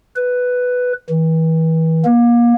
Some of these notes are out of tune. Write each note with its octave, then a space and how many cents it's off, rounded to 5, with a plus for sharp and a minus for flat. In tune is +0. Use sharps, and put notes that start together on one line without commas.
B4 +5
E3 -35
A#3 +30